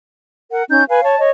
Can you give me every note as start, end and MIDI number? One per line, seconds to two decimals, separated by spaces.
0.51 0.63 70
0.51 0.63 78
0.68 0.83 61
0.68 0.83 63
0.68 0.83 91
0.88 1.04 71
0.88 1.04 77
0.88 1.04 80
1.04 1.19 73
1.04 1.19 81
1.19 1.30 73
1.19 1.30 75